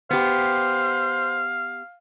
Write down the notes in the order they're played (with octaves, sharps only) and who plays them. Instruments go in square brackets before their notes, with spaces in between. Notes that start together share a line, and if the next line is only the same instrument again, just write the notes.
[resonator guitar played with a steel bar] B3 G4 [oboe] C5 [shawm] F5